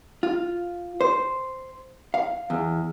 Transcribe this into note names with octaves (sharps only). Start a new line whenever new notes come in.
F4
C5
F5
E2